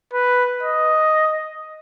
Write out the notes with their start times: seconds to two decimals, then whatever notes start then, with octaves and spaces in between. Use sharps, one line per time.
0.13 B4
0.63 D#5